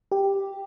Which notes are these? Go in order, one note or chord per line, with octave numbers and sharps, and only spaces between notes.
G4